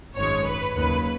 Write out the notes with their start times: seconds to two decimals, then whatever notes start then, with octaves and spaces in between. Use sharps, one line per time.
0.16 G#1 F#2 D#3 G#3 C#5
0.47 B4
0.77 D#2 C#3 F#3 B4